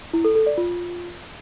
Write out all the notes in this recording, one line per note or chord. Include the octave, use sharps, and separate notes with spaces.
E4
A4
A4
D5
F4